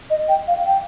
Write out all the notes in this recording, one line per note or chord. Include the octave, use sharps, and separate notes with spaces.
D#5
G5
F5
G5